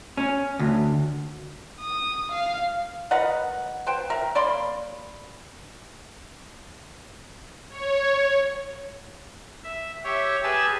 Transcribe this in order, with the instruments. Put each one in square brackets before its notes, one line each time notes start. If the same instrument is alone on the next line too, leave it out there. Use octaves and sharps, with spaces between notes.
[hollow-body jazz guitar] C#4
D2
[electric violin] D#6
F5
[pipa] A#4 B4 D#5 F#5
B4 C5 G5
A#4 E5
A#3 D5 B5 C6
[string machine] C#5
[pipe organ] E5
G4 C#5 E5
G4 G#4 B4 G#5 A5 E6